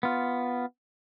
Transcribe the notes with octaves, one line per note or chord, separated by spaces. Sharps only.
B3 F4